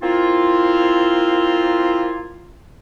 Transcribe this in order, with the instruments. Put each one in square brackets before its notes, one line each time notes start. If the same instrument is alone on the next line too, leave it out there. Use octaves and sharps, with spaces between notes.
[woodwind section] A#3 C4 E4 F4